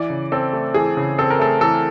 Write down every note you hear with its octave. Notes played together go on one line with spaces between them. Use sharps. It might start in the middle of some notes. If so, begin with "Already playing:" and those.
Already playing: E3 D5
C#3
C4 A4
A3
E3 G#4
C#3
C4 A4
A#4
A3 A4
E3 A4